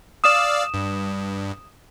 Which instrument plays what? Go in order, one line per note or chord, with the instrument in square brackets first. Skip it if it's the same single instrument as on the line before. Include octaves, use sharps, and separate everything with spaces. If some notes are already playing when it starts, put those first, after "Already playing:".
[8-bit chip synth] D5 F5 E6 [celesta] D#6 E7
[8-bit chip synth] G2